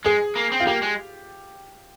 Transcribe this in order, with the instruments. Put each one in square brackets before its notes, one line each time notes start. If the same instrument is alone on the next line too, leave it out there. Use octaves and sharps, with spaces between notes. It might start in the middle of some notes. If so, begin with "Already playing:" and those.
[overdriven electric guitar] G#3 [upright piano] G#4
[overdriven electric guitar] A#3
C4
[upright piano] F4
[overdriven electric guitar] A#3 [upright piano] G4
[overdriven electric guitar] G#3